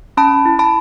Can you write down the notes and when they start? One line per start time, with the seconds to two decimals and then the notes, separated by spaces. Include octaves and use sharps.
0.17 C#4 A5 B5
0.45 E4
0.59 A5 B5